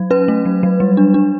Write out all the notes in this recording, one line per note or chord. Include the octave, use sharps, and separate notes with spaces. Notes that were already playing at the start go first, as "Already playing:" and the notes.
Already playing: F#3
C#4 B4
A3
F#3
F#3
G3
D4
D4